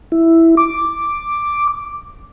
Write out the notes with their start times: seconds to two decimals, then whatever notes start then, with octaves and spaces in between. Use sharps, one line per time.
0.12 E4
0.57 D6